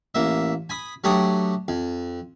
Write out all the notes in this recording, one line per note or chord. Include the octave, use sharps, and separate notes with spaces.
A1 A#3 E5
G#5 B5 D#6
F#3 A3 D4 G4 C#5 D#6
F2